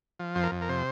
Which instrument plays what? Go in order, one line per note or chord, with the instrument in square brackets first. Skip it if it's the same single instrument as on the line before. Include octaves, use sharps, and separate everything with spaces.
[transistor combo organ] F3
F2 C5
A#4
F2
A#4
C3 C5